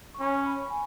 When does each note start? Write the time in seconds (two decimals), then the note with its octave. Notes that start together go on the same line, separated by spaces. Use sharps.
0.14 C#6
0.20 C#4 B5
0.41 C#6
0.46 B5
0.70 G#5